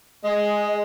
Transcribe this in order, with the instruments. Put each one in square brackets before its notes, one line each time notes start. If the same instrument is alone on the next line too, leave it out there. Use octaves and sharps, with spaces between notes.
[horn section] G#3 [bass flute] D#5